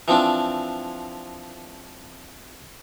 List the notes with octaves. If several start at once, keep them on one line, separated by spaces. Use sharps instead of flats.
E3 F3 C4 D4